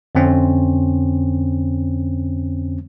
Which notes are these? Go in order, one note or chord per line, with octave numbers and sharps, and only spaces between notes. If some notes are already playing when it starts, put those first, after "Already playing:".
F2 D3 C4 C#4